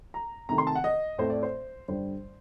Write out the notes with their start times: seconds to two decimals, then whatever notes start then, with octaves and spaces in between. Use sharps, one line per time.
0.14 A#5
0.49 C3 D#3 A3 A#5
0.58 C6
0.67 A5
0.75 F#5
0.84 D#5
1.18 A2 A3 C4 C5
1.30 D5
1.43 C5
1.88 G2 D3 G3 C5